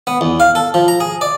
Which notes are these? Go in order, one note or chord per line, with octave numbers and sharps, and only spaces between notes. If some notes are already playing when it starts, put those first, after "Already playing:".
B3
E2
F5
A4
F3
A#5
G#4
D5